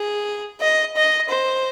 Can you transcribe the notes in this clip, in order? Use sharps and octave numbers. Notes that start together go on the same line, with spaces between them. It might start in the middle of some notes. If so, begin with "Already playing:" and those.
Already playing: G#4
D#5
D#5
C5